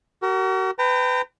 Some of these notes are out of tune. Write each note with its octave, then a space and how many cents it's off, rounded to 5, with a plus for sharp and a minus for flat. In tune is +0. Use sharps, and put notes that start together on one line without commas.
F#4 +40 A#4 -20
B4 +25 G5 +0 A#5 -30